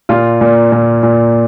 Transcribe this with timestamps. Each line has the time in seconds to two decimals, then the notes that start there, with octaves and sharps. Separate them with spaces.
0.09 A#2 F4
0.41 A#2
0.72 A#2
1.03 A#2